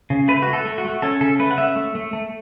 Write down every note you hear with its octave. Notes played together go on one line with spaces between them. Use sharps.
C#3
A3 B4
A3 F#4
A4
A3
F#4
A3
C#4 A4
C#3 A4
A3 B4
F#5
C#4 E5
A3
A3
A3